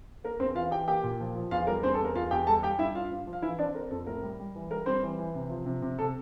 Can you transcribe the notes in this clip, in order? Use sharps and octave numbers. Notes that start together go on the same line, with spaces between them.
A#3 A#4
E2 C4 C5
E3 F4 F5
E3 G4 G5
A#3 G4 G5
A#2
F3
F3
E2 F4 F5
G3 A#4
E2 C4 C5
A4
E2
A#4
E2 F4 F5
E2 G4 G5
G3 A4 A5
G3 G4 G5
G2 E4 E5
G2 F4 F5
G2
F3
F5
E3 E4 E5
C4 D4 D5
C4 A#4
F2 A4
A2 A#4
G3
G3
E3
G3 A#4
G3 C4 C5
E3
E3
C3
F3
C3
C3
C3 A4